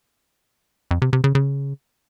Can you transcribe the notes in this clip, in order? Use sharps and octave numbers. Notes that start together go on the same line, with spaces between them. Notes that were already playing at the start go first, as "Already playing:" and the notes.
F2
C3
C3
C#3
C#3